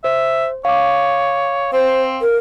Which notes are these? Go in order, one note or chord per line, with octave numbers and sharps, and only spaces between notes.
C5 E5
C#5 F5 D6
C4 C5
A#4